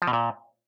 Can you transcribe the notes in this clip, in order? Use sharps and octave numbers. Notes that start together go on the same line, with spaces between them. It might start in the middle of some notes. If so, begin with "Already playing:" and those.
F3
B2
A#2